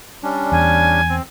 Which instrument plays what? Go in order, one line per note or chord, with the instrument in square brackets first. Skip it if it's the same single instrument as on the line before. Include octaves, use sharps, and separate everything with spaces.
[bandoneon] G3 C#4 D4
[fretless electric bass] E2 [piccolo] G#5
[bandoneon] C4